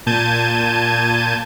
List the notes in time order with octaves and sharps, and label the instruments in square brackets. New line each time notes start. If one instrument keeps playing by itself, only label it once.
[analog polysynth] A#2 A5 G6 G#6 D#7